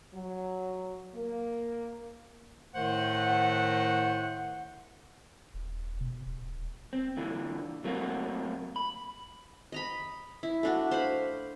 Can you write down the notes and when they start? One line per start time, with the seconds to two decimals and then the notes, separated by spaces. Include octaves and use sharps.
0.14 F#3
1.14 A#3
2.75 A2 D#3 A3 C5 F#5
5.54 D#1
6.01 B2
6.26 D1
6.93 C4
7.17 A#2 D3 E3
7.84 F#3 A3 A#3 C4 F#4
8.76 B5
9.72 D#5 A#5 B5
10.43 E4
10.63 A3 D4 F#4
10.91 C5 F5 B5